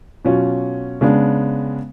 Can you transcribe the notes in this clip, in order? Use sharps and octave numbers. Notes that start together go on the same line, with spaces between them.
B2 F#3 C#4 F4
C#3 G#3 B3 D4